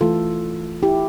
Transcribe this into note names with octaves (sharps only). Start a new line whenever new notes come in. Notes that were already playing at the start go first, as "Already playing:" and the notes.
E3 A3 F4 A4
E4 G4